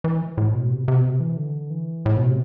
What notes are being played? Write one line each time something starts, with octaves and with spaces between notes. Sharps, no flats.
E3
A2
B2
C3
C3
B2
C3
E3
D3
E3
A2
B2
C3